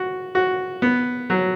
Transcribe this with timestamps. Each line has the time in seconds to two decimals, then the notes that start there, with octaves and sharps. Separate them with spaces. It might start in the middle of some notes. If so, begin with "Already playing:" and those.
Already playing: F#4
0.35 F#4
0.82 B3
1.30 F#3